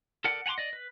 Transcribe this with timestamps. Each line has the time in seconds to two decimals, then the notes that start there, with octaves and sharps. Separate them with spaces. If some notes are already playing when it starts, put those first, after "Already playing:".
0.24 A4 A#4 D5 F#5
0.46 F#5 G#5 A#5 C6 D6
0.58 D5 D#5
0.73 B4